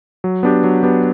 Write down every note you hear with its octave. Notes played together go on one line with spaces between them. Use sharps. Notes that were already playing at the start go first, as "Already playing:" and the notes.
F#3
B3 D4 G4
F#3
B3 D4 G4